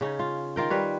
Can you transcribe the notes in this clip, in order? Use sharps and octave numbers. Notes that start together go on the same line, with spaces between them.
C#3 C#4 D#4
F4
D#3 F4 A#4 G5
G3 B4 C#5